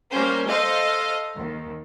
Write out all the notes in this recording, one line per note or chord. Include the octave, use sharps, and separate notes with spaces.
G3 A#3 C#4 C5
A4 C5 D#5 F5
D#2